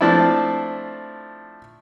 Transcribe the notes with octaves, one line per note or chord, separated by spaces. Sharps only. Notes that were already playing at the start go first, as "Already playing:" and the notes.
F3 A3 C4 D4 E4